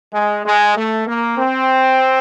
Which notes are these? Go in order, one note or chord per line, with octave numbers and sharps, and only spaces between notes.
G#3
G#3
A3
A#3
C4